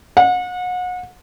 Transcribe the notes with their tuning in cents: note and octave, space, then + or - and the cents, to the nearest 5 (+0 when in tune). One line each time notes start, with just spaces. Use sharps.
F#5 -35